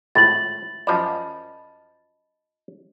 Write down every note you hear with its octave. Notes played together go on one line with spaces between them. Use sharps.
G#1 A2 F4 E5 A6 F#7
F#2 F3 D5 D#5 A5 B5